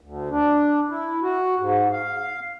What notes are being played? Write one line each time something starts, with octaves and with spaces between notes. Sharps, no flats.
D2
D4
E4
F#4
G#2
F5